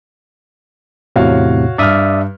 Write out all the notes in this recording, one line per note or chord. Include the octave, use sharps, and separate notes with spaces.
E2 A2 C3 F#4 C#5 F5
G2 D5 E5 D#6 F6